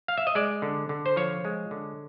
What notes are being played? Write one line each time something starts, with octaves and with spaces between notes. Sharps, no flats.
F5
E5
D#5
G#3 D5
D3
D3
C5
F3 C#5
G#3
D3